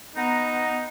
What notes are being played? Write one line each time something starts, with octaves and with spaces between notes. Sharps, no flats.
B3 D#4 F#5 A#5